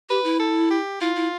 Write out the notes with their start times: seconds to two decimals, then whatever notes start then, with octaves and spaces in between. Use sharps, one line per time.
0.10 G4 B4
0.24 E4
0.40 A4
0.71 G4
1.01 E4 F4
1.16 E4